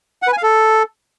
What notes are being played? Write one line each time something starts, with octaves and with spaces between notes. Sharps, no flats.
F#5
B4
G#5
F5
A4